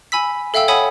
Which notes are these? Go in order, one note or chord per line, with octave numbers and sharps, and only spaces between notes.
G#5 B5 E6 B6
A4 E5 F5 G5 E6
C#5 F#5 G#5 B5 D#6 B6